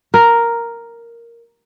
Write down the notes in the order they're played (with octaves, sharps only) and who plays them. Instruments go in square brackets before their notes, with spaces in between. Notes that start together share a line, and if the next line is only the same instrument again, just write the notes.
[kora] A#4